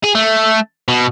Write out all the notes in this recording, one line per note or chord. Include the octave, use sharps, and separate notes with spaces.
G#4
A3
B2